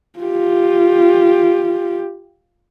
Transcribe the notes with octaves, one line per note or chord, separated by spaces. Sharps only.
F4 G4